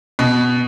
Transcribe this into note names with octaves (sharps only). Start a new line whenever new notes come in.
B2